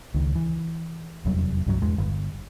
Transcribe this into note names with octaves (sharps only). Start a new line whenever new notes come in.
C#2 D#3
E3
F1 E2 F#3 G3
C2 G2 F#3
E2 G#3
G1